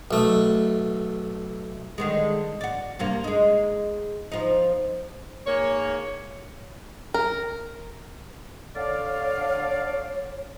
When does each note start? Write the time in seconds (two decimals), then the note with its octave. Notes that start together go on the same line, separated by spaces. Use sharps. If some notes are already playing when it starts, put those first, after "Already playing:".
0.11 B1 A3
1.98 D3 D#3 G#3
2.61 F#4 D5
2.99 G2 C3 A#3
3.24 G#3 D#4
4.32 F3 D#4
5.47 G#2 A#3 C#5
7.14 A#4
8.76 D3 C#5 D5 F5